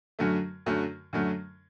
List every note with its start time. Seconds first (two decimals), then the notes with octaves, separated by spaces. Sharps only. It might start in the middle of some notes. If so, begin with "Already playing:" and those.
0.19 F#2 D3 F#3 A3
0.66 F#2 D3 F#3 A3
1.13 F#2 D3 F#3 A3